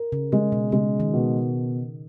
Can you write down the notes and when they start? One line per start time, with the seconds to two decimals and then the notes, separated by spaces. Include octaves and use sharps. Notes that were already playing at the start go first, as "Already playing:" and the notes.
Already playing: A#4
0.12 C#3
0.32 C#3 G#3
0.52 B2
0.72 C#3 G#3
1.00 D#3
1.13 B2